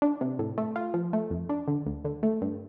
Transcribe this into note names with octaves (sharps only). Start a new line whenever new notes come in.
D4
C3
A2
A3
F4
F3
A3
F2
D4
D3
D2
D3
A3
G2